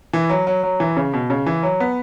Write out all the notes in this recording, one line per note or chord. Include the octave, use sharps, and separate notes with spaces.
E3
F#3
F#3
F#3
E3
C#3
B2
C#3
E3
F#3
B3